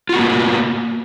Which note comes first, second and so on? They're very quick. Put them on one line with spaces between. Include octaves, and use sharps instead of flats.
F4 F#4 B3 A#3